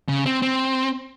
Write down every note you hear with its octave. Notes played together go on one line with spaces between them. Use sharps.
C#3
C4
C4